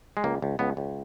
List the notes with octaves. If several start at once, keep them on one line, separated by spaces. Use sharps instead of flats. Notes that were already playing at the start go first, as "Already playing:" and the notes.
G#3
C#2 A#3
C#2
C#2 B3
C#2